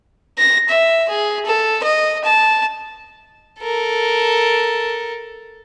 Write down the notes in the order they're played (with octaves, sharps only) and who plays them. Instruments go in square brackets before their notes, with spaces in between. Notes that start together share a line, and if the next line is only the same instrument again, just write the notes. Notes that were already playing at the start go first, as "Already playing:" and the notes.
[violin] A#6
E5
G#4
A4
D#5
A5
[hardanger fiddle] A4 A#4